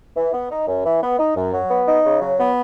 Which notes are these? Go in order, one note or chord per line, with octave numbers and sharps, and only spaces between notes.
E3
B3
D#4
F#2
E3
B3
D#4
F#2
F#3
B3
D#4
C#3
F#3
B3